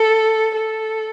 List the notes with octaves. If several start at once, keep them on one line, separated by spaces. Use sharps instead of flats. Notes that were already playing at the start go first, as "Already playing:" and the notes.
Already playing: A4
A4